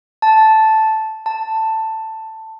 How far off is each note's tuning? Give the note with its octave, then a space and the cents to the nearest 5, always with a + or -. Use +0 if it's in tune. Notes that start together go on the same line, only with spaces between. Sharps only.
A5 -5
A5 +10